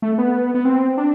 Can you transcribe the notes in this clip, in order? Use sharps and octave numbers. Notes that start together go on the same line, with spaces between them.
A3
B3
B3
C4
D4